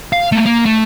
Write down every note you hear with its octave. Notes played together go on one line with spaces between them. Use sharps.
F5
A3 A#3
A#3
A3